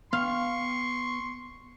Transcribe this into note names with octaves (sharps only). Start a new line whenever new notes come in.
B3 F5 G5 C6 C#6